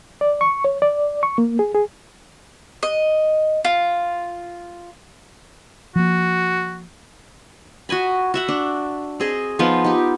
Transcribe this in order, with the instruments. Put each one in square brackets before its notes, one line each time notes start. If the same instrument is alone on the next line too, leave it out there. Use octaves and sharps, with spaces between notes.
[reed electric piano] D5
C#6
C#5
D5
C#6
A#3
G#4
G#4
[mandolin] D#5
F4
[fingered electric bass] F3 A#3 [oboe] F#4
[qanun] F#4 D#5 G#5 B5
F#4 E5 F#5
D4
C4 G#4 D#5
F3 B3 D#4 F4
D#4 G4